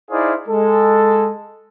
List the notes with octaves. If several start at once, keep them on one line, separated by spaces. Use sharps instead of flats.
D#4 E4 G#4 C5 D5 F5
G#3 A4